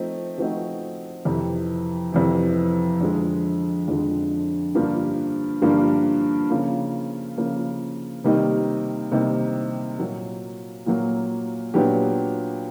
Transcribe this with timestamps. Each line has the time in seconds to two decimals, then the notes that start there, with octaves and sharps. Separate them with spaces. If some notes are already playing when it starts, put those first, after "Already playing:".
Already playing: F3 A3 C4 D#4
0.38 F3 A3 C4 D#4 F#4
1.25 F2 C3 E3
2.12 F2 C3 E3
3.01 F2 D3 F3 G#3
3.88 F2 D3 F3 G#3
4.75 G2 D3 F3 A#3 D4
5.62 G2 D3 F3 A#3 D4
6.50 C#3 F3 A#3
7.37 C#3 F3 A#3
8.24 C3 D#3 G3 A#3 D#4
9.12 C3 D#3 G3 A#3 D#4
9.99 A#2 F#3 A#3
10.86 A#2 F#3 A#3
11.74 A#2 F#3 B3 D4 G4